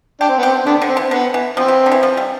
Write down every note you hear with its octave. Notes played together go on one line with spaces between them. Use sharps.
D4 G4
C4
B3
G4
C4
D3 B3 D4
D3
C4
E3
D3 B3
E3
F3 C4
E3
D3
E3
F3
G3